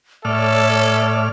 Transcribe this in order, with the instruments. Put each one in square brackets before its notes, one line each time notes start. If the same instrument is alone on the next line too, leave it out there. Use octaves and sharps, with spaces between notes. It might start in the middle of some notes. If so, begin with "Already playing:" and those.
[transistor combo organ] A2 D5 F6 [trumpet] A4 [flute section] C#5 [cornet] E5